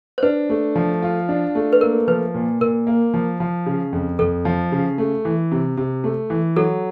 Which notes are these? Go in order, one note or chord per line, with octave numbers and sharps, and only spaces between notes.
C5
D4 B4
A3
F3
F4
D4
A3
B4
A#3 A#4
F3 B4
A#2
A#2 A#4
A#3
F3
F3
C#3
F2
F2 A4
F3
C#3
A3
E3
C3
C3
A3
E3
F#3 A4